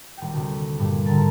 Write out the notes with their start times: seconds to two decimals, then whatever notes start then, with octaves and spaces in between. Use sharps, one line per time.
0.17 D#1 G5
0.33 D2 C3
0.79 G2 A#2
1.06 G#2 D3 A4 A#4 A5